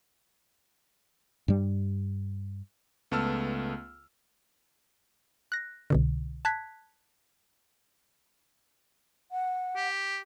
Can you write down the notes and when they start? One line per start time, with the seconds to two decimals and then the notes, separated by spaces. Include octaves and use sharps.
1.48 G2 G3
3.11 C#2 A3 B3 A5 E6 F6
5.52 F#6 A#6
5.90 C2 B2 D3
6.45 A5 F#6 G#6 B6
9.32 F#5
9.76 G4